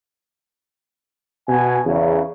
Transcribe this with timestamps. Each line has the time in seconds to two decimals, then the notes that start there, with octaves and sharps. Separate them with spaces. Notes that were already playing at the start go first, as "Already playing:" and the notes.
1.49 B2 G#5
1.86 E2 C#3